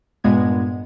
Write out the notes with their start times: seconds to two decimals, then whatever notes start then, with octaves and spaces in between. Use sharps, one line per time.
0.24 G2 A#2 G#3 B3 G#6